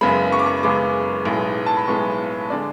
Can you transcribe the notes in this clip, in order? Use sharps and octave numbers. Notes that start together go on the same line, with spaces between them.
F#1 F#2 C#3 G#3 B3 B5
C#6
D6
C#6
F#1 F#2 C#3 G#3 B3 D6
B1 A2 G#3 B3
A5
B5
B1 A2 G#3 B3 C#6
D3 G#3 D5